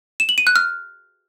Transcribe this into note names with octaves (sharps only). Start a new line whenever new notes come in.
E7
F#7
D#7
F#6
F6